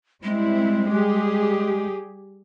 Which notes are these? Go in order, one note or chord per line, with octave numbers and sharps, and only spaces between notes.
G3 G#3 C4 E4
G3 G4 G#4